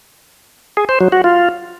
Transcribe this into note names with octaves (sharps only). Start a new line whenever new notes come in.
G#4
C5
F#3
F#4
F4